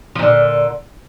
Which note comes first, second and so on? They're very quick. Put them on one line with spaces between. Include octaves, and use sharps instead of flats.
F3 A#2 D3